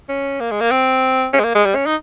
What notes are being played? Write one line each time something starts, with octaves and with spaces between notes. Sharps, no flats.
C#4
A#3
G#3
A#3
C4
C#4
G#3
A#3
G#3
G3
C#4
D#4